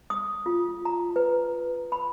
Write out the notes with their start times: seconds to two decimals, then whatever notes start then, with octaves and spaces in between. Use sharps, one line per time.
0.10 D#6
0.46 F4
0.85 A#5
1.16 B4
1.92 B5